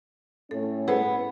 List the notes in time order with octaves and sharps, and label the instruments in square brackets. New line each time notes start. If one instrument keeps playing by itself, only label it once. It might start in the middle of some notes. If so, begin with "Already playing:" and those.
[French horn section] A2 A3 C#4 [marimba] A4
[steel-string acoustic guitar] B3 [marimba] E4 G#4 C5